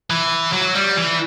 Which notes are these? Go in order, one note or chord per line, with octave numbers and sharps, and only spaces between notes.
E3
F#3
G3
E3